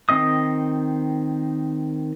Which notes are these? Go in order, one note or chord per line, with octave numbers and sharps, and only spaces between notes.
D#3 C4 D#5 D#6